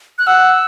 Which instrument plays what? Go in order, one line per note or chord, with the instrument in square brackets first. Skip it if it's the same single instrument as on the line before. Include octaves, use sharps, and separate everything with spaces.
[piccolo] F#6
[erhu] F#5 [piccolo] E6